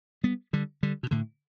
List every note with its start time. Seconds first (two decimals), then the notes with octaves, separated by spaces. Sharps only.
0.23 G3 B3
0.53 D3 G3
0.83 D3 G3
1.03 B2
1.11 A2 D3